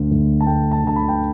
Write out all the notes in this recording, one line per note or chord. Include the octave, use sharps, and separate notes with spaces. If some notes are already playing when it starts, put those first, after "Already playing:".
Already playing: D2 D3 A3
D2
A5
A3 G5
A5
D3 A5
B5
G5